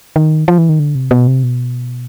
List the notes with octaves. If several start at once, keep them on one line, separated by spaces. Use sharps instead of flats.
D#3
F3
E3
D#3
D3
C3
B2
C3
B2